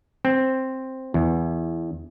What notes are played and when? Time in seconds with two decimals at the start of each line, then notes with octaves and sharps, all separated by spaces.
0.25 C4
1.14 E2